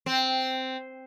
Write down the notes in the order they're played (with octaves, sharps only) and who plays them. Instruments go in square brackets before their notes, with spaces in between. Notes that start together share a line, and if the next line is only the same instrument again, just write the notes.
[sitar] C4